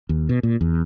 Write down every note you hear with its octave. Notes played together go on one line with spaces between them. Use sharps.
D#2
B2
A#2
E2